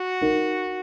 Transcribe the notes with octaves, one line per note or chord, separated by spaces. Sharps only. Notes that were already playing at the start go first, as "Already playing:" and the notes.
Already playing: F#4
D#4 A#4